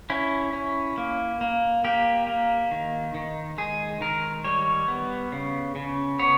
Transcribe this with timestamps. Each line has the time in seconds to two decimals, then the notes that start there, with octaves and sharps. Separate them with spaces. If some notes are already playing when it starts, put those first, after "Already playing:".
0.10 C#4 E4
0.53 C#4
0.98 A#3
1.41 A#3
1.84 A#3 G4
2.27 A#3
2.71 D#3
3.14 D#3
3.58 G#3 G#4
4.01 D#3 A#4
4.44 G3 C#5
4.88 B3
5.32 C#3
5.76 C#3
6.19 B3 C#5